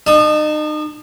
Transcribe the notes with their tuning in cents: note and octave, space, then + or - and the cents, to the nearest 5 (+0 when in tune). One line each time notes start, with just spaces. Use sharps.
D#4 -35 A5 +0 D#6 +40